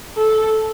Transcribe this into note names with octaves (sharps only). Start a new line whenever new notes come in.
A4